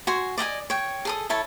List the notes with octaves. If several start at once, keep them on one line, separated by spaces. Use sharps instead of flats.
F#4 G#5 C6
D5 D#5 G5 G#5
C#5 G5
G#4 A4 D#6
E4 A4 C#5 A5